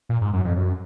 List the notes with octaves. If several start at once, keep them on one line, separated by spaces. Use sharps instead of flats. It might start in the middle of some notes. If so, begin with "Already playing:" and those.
A#2
G#2
F#2
F2
F#2